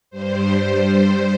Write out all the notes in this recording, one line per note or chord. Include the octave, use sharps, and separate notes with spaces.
G2 G3 C5